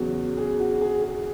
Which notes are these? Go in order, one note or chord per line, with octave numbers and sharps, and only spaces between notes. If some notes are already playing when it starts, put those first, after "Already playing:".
Already playing: E2 C#3 F#3 F#4
G#4
F#4
G#4
G#4